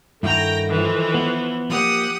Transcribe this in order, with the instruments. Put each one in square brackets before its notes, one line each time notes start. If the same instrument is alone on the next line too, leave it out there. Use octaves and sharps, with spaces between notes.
[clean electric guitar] G2 E4 F#4 [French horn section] D#3 A4 [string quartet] G5 A#5 A#6
[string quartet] E3 F3
[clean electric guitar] B3
[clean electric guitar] F3 A#3 [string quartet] G4 F#5 D#6